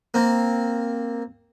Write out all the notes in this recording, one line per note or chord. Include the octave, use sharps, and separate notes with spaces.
A#3 C4